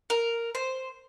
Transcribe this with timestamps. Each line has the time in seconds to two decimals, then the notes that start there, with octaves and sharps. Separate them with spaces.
0.10 A#4
0.55 C5